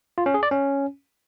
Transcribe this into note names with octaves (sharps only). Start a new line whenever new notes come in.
F4
C#4
G#4
D5
C#4